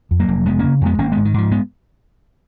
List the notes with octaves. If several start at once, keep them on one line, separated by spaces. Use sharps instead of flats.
F2
F#3 A#3
F1
F1 G#3 B3
C#3 A#3 C#4
F2 G#3 B3
G#1 A#3 C#4
G#2 G#3 B3
D#3
G#2 F3
G#3 B3